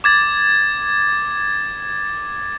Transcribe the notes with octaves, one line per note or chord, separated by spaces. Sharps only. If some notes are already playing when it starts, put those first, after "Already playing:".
D6 G#6 A6